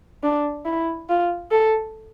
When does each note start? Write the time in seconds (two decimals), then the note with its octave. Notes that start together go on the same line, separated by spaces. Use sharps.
0.23 D4
0.65 E4
1.09 F4
1.51 A4